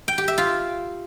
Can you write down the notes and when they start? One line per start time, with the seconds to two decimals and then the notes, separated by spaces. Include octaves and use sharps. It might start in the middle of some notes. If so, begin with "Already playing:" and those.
0.08 G5
0.18 G4
0.28 E5
0.38 F4